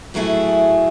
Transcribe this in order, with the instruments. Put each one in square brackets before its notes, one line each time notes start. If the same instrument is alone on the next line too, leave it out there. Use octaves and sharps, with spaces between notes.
[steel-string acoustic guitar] A2 F#3 A3 E4 G#4